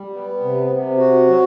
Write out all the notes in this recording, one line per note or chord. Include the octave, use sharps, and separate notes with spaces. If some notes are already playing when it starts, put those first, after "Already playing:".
Already playing: G3
B3
C3
C3
F#4
F#3